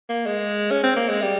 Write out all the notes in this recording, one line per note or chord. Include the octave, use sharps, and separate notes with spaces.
A#3
G#3
C#4
C4
A#3
G#3
G3